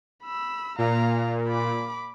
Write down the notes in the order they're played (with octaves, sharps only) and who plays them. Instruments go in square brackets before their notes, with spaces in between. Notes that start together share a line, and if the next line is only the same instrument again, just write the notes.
[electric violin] B5 E6
[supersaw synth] A#2 [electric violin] F5 A#5
[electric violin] B5 D6